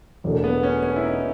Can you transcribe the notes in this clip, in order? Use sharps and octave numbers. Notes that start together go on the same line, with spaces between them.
E1 E2 B2 F#3 A3
B3
C#4
C#4
E4
D#4